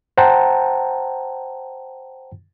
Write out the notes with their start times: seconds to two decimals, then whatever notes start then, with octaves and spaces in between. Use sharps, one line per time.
0.18 C5 F#5 G5 A5 A#5